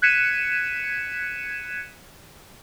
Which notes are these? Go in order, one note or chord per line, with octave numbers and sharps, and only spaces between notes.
F#6 G#6 B6 C#7 D#7 E7